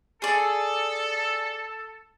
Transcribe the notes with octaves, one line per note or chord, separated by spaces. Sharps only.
G#4 A4 D5